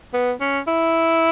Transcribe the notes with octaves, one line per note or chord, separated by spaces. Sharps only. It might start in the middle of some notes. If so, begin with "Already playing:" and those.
B3
C#4
E4